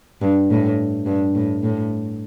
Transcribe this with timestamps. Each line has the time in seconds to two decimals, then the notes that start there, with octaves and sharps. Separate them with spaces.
0.21 G2
0.50 A2
1.06 G2
1.35 A2
1.63 A2